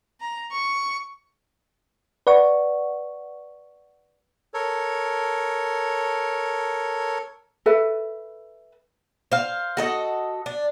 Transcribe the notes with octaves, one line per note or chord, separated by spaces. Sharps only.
A#5
C#6
B4 D5 F#5 C#6
A4 A#4 C#5
A4 B4 E5
C5 F5
F#4 A4 D#5
D4